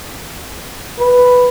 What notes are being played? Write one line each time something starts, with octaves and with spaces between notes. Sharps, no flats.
B4